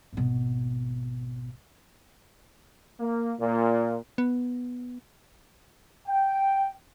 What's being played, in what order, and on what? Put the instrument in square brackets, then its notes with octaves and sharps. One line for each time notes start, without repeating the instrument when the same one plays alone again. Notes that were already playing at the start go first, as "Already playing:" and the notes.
[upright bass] G#1 B2
[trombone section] A#3
A#2
[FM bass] B3
[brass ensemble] G5